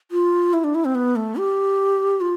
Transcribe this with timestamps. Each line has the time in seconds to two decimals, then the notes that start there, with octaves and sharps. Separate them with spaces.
0.11 F4
0.53 E4
0.64 D4
0.75 E4
0.85 C4
0.95 B3
1.16 A3
1.37 G4
2.21 F4